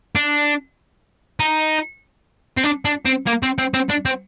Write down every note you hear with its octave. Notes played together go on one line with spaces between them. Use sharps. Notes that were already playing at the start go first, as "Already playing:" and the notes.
D4
D#4
C4
D4
D4
C4
A#3
C4
C4
C4
D4
C4